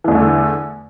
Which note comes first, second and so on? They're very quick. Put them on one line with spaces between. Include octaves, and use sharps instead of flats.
E3 E2 A3 D3